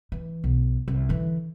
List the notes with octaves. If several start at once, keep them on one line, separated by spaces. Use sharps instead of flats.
E3
B1
C2
D3 E3